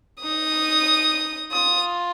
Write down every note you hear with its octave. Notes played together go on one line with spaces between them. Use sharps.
D#4 D#6
F4 D#6